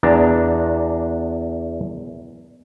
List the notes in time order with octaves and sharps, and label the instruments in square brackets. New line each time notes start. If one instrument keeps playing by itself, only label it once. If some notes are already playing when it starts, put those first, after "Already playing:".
[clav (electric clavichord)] E2 D4 A5 A#5